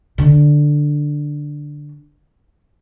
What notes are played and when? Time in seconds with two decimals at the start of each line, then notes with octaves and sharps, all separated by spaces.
0.18 D3 D4